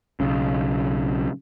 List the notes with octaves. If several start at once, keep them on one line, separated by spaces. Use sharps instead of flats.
B1 C#3